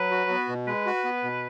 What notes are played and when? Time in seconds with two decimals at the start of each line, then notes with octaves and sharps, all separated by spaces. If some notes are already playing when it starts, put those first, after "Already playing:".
Already playing: F#3 B4
0.11 F#4
0.30 B3
0.49 B2
0.67 G#3 B4
0.86 F#4
1.04 B3
1.24 B2